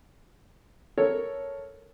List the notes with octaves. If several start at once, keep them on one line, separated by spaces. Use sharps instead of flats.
A4 A#4 C#5